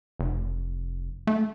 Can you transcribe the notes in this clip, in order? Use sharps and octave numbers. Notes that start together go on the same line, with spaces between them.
F1
A3